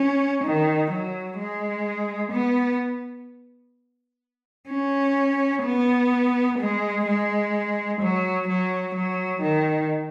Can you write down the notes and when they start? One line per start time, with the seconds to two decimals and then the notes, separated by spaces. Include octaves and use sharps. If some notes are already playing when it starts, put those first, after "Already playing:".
Already playing: C#4
0.44 D#3
0.91 F#3
1.39 G#3
2.32 B3
4.70 C#4
5.65 B3
6.59 G#3
7.06 G#3
8.01 F#3
8.48 F#3
8.95 F#3
9.42 D#3